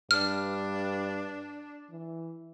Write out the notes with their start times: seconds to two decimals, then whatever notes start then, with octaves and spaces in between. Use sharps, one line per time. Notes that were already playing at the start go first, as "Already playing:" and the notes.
0.11 G2 D4 F6
1.90 E3